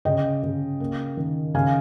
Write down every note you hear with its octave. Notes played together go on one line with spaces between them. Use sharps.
C#3 D#5 G5
C#3
A#3
D#3
C#3 F5 G#5